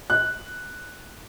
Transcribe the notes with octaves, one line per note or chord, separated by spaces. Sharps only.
F#6